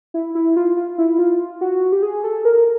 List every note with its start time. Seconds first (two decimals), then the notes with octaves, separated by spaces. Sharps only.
0.14 E4
0.35 E4
0.56 F4
0.77 F4
0.98 E4
1.18 F4
1.61 F#4
1.92 G4
2.03 G#4
2.24 A4
2.45 A#4